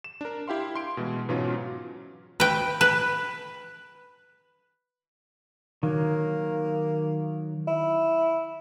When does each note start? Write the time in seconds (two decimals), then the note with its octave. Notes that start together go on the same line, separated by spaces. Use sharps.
0.04 E7
0.21 D4 A#4
0.48 E4 G4 F5 C6
0.75 C6 D7
0.97 B2 E3 G#3
1.29 G#2 B2 E3 F#3 C#4 F4
2.40 B4 G5
2.81 B4
5.83 D#3 F#3 A#3
7.67 E4